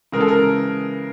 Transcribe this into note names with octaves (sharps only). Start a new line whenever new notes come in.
C#3 E3 G#3 A#4
A4
A#4